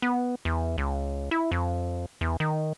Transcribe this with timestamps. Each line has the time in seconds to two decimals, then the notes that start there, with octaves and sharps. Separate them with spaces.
0.02 B3
0.45 E2
0.78 C#2
1.31 E4
1.52 F2
2.21 E2
2.40 D#3